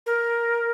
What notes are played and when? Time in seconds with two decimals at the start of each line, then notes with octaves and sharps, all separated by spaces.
0.06 A#4